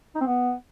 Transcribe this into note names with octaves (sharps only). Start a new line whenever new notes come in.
D#4
C4
B3